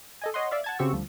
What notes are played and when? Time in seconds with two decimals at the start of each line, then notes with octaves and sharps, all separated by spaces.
0.21 A4 D#5 G#5
0.34 C#5 D#5 F#5 C6
0.51 D5 E5 F5
0.64 F#5 A5 G#6
0.79 C#3 C4 F#4 G4 C#6 E6
0.92 D2 F3 G3